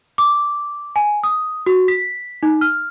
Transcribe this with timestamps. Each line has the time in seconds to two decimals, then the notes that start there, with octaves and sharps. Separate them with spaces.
0.18 D6
0.96 G#5
1.23 D#6
1.66 F#4
1.88 B6
2.43 D#4
2.61 F6